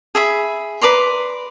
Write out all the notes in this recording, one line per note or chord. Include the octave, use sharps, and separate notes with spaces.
G#4 E5 B5
B4 D5 A#5 C6